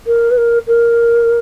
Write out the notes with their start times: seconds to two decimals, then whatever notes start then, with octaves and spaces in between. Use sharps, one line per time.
0.07 A#4
0.31 B4
0.37 A#4
0.67 A#4